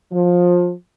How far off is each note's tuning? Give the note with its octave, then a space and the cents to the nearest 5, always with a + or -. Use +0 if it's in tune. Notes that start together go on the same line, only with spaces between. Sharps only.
F3 +20